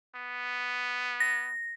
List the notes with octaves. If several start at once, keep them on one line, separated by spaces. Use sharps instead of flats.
B3
A#6